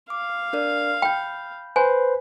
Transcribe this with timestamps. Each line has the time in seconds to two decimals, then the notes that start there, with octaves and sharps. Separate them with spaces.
0.10 F5 D6
0.53 D4 A#4 D5
1.02 G5 B5 G6
1.76 B4 C5 G#5